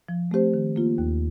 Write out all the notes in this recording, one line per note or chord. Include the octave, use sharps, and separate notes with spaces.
F3
A3 C4 G4 C5
D#3
A#3 F4
D#2